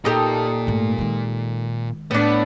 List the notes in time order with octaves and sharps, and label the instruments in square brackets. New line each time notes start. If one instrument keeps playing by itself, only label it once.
[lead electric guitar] A#2 A#4 [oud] D#4 G4 A4
[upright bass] G#2 A3
D#3 G#3
[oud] A2 D4 [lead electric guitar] B3